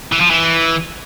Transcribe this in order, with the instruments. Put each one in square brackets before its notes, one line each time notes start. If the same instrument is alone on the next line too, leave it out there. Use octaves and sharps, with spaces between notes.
[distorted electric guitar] E3
F3
E3